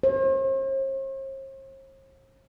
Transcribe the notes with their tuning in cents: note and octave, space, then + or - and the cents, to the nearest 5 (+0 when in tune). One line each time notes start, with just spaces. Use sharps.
C5 +45